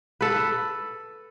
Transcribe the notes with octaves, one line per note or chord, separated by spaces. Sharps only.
A4 B4